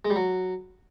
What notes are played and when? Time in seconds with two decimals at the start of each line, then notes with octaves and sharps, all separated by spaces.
0.05 G#3
0.10 G3
0.16 F#3